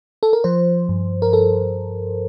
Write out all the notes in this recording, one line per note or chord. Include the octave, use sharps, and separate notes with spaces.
A4
A#4
F3 C5
G2
A#4
A4